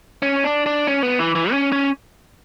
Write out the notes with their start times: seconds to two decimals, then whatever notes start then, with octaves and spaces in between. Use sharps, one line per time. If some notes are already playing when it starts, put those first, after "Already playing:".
0.22 C#4
0.44 D4
0.66 D4
0.87 C#4
1.03 B3
1.19 E3
1.35 E3
1.51 C#4
1.72 C#4